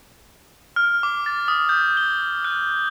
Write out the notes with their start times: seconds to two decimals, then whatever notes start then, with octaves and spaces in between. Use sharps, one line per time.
0.76 F6
1.03 D6
1.26 A6
1.48 D#6
1.69 G6
1.97 G7
2.45 F#6